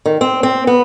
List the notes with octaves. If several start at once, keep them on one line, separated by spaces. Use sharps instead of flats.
D#3
C4
C4
B3